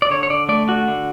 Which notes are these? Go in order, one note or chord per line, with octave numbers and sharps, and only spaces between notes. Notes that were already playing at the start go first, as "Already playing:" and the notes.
D5
D3 C#5
C#5
D3 D5
A3 D5
D3 F#4
D3